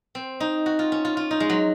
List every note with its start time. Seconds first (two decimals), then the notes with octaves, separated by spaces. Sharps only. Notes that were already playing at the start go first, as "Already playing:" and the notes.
0.15 C4
0.40 D#4
0.66 F#4
0.79 F4
0.92 C#4
1.05 F4
1.17 F4
1.31 D#4
1.40 G#3
1.50 F#3